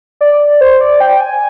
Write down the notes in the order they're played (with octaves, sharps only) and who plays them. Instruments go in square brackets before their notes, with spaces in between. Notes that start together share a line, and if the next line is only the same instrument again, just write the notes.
[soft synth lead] D5
C5
D5
G5
G#5